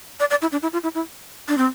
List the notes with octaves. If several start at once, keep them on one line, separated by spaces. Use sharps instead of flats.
D5
D5
E4
D4
E4
F4
E4
E4
D4
C4